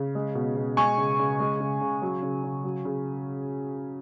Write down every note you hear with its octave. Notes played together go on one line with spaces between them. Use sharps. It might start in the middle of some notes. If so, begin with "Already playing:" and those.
Already playing: C#3
G#3
B2
B2
G#3 G#5 C#6
C#3
C#3
G#3
C#3
C#3
F#3
C#3
C#3
F#3
C#3